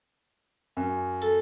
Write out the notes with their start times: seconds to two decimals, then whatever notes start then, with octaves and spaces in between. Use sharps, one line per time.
0.77 F#2
1.22 A4